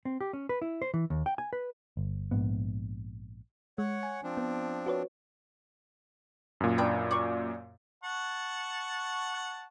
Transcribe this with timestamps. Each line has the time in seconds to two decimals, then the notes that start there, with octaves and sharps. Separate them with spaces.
0.05 C4
0.21 G4
0.33 C#4
0.49 B4
0.62 E4
0.82 C5
0.94 E3
1.10 D#2
1.26 G5
1.38 G#5
1.53 B4
1.97 G1
2.31 A#1 G#2 B3
3.78 G#3 C#5 F#5
4.03 G#5
4.23 F3 C4 D4
4.37 B3
4.86 F#4 B4 C#5
6.60 F#2 A#2
6.78 D4 B4 G5
7.11 D5 C#6
8.04 F#5 A5 C#6